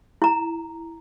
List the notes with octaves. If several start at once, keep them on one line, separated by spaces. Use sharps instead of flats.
E4 A#5